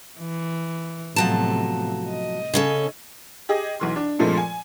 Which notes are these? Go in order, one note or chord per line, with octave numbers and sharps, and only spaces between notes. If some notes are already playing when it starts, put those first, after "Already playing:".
E3
A2 C3 F3 F#3 B3 A5
D#5
C#3 C#4 A4
G4 G#4 D#5
B1 E3 C6
D4
G2 A#2 F3 G#3 A3 C4
G#5